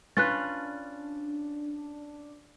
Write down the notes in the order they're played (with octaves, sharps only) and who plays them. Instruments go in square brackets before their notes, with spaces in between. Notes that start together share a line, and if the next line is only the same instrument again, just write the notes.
[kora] C#4 F4 B4 [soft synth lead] D4 [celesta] F#6 A6